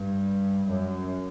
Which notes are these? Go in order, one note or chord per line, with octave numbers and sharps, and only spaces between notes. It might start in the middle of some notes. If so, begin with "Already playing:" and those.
Already playing: G2
F#2